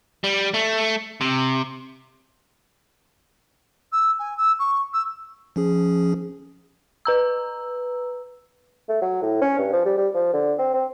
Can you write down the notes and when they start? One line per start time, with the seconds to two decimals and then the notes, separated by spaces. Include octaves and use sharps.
0.24 G3
0.54 A3
1.21 C3
3.92 E6
4.19 G#5
4.37 E6
4.59 C#6
4.93 E6
5.56 F3 C#4 G#4
7.05 B4 A#5 E6
8.89 A3
9.02 F#3
9.22 A2
9.41 C#4
9.58 G2
9.72 F3
9.85 G3
9.97 G3
10.14 F3
10.33 D3
10.58 C4
10.74 C4